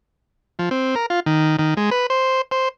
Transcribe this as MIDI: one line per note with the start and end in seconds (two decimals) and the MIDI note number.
0.59 0.69 53
0.71 0.95 60
0.95 1.06 70
1.10 1.20 65
1.26 1.56 51
1.59 1.74 51
1.77 1.90 56
1.91 2.07 71
2.10 2.41 72
2.51 2.69 72